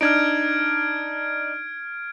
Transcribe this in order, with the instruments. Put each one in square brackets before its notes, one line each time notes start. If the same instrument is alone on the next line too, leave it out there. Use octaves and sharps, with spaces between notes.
[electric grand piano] D4 D#4 [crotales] F6 G#6 D7